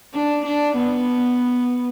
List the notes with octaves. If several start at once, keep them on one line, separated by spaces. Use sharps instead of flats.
D4
D4
B3